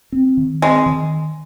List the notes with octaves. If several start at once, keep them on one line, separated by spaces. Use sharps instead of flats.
C4
D#3
G#3 C4
D#3